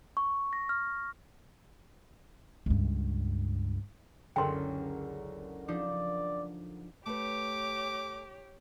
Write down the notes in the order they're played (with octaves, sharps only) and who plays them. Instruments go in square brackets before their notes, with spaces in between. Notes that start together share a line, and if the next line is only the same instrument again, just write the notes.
[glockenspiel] C#6
A#6
F6
[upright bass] C#2 G2
[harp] F#1 C#2 A4 [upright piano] D3 A#4 [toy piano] G5 C6
[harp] F3 D4 D#4 [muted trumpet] D5
[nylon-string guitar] A3 B4 [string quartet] G4 C#5 [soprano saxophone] D6